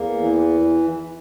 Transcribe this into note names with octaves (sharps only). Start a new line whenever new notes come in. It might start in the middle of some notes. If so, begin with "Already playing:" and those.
Already playing: E2 A#3
E3